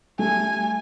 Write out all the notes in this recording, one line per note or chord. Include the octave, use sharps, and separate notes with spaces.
G3 A3 G#5